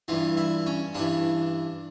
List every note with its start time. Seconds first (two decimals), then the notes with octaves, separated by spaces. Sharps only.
0.08 G2 E3 F4
0.37 E4
0.66 C#4
0.95 G2 E3 D4